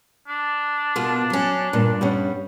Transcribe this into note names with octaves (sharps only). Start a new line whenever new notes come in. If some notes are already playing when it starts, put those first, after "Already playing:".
D4
B2 A#3 F4
F#3 C#4
G2 A#2
G3 B3 C#4